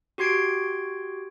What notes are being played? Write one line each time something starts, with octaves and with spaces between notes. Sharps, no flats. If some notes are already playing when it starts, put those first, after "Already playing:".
F#4 G4 C6 G#6 C7 D7